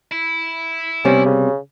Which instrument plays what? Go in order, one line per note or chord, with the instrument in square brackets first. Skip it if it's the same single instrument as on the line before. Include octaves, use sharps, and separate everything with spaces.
[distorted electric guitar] E4
[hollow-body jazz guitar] C3 G3 B3 [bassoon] C#4
[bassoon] C#3